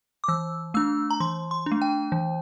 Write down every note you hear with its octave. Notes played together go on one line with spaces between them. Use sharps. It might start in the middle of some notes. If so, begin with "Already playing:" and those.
D6
E3 E6
A3 D4 E6
A#5
E3 C6
C6
D4
A3
G5
E3